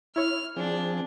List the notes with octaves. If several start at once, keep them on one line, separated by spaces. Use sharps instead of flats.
E4 C#5 F6
F3 C4 D4 G#4